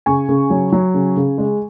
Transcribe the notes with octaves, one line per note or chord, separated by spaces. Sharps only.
C#3 G#5 C#6
C#3
F#3
F#3
C#3
C#3
G#3